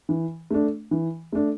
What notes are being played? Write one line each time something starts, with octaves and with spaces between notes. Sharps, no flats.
E3
A3 D4
E3
A3 D4